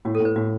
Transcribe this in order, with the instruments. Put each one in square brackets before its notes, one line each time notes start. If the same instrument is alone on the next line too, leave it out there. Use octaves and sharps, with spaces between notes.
[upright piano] A2 [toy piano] F#4
[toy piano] A4
[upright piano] A2
[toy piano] B4
[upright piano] A2 [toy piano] F#4